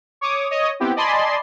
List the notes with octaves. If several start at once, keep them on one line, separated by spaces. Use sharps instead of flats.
C#5 D6 D#6
C#5 D#5 D#6
B3 C4 E4 G4
D5 D#5 G#5 A5 B5 C6